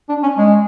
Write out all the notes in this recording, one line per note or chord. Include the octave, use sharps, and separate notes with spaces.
D4
C#4
G#3